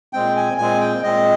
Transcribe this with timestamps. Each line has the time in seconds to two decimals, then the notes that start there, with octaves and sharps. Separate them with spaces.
0.13 A#2 G#3 C4 G5
0.36 G#5
0.58 A#2 G#3 C4 G#5
0.81 G5
1.03 A#2 G#3 C4 D#5